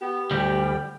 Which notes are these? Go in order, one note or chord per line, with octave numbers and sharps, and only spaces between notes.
B3 G4
D2 G3 G5